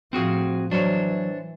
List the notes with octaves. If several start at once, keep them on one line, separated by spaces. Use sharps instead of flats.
A2 F3 C4 F#4 G#4
E3 F#3 D4 C5 C#5